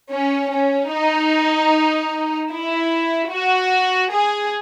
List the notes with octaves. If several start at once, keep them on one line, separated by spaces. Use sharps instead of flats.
C#4
C#4
D#4
E4
F#4
G#4